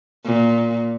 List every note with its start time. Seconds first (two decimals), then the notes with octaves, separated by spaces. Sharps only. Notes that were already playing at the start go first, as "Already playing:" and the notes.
0.25 A#2